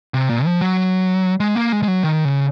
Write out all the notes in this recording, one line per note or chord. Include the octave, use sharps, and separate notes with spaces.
C3
A#2
F3
F#3
G#3
A#3
G#3
G#3
F#3
D#3
C#3